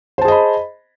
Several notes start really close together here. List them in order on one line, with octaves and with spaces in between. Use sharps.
C5 A5 G#4 D#5 B5